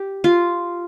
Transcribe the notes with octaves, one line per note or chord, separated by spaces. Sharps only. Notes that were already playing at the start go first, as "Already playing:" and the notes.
Already playing: G4
F4